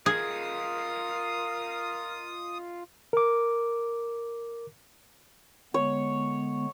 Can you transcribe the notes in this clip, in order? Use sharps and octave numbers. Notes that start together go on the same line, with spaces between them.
F4 G#4 A#4 D#5 D#6
A#4 D6
D3 G#3 B3 C#5